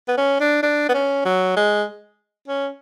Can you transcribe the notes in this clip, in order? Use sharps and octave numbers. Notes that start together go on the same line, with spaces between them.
B3
C#4
D4
D4
B3
C#4
F#3
G#3
C#4